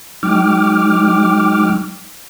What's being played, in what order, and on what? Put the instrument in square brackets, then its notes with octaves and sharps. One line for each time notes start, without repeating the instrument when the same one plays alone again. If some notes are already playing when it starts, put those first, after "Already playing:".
[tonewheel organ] F#3 G#3 D#4 G5 D6 F6